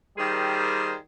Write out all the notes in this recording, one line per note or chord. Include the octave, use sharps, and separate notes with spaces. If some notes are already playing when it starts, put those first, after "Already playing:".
D#3 G3 F4 G#4 A#4 C5